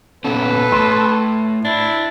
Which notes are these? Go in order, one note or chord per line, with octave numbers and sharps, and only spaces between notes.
A#2 B3 C#4 A4 B4
A2 C6
D4 E4